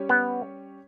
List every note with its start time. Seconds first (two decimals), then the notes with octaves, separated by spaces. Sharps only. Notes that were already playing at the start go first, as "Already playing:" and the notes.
Already playing: G3 C#4 G4 C#5
0.09 B3